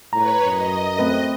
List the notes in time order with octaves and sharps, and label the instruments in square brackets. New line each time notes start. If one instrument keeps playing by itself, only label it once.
[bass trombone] A2 [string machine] B4 C#5 [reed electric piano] A#5
[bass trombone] F#2 [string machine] D#5
[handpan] A3 C4 B4